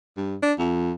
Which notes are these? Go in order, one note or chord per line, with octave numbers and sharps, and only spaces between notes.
G2
D4
F2